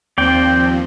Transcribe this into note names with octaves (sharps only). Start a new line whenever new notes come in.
D#2 F3 C4 D5 G5